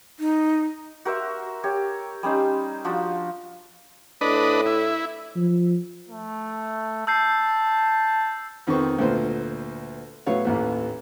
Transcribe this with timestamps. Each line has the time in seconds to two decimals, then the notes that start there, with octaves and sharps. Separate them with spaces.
0.20 D#4
1.05 F#4 A#4 C5 E5
1.64 G4 C#5
2.23 G3 C#4 D#4 C5
2.85 F3 D4 F4 F#4
4.21 A2 D4 B4 D#5
4.66 E4
5.36 F3
6.09 A3
7.07 A5 E6 G6 C7
8.67 F2 D#3 B3 C5 C#6
8.98 D2 A#2 B3 C5
10.26 A2 F#3 B3 C#5 F5
10.45 A1 D#2 E3